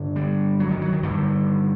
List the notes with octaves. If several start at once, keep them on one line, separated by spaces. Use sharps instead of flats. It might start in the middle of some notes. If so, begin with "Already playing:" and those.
Already playing: G2 D3
G3
F#3
D#3
F#3
D#3
G2 D3 D#3